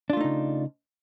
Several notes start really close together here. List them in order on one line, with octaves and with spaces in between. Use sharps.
D4 F4 A3 D#4 C#3